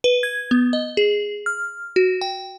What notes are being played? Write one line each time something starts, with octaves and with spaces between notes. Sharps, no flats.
B4
G#6
B3
D#5
G#4
F6
F#4
G5